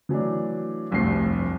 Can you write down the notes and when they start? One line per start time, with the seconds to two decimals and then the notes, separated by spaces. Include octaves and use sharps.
0.09 E3 F#3 A3 D4
0.91 F1 C2 G2 A3 C7